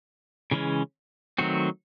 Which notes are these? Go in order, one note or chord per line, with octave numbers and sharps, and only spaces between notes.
C#3 E3 G#3 C#4
D#3 F#3 A3 C4 F#4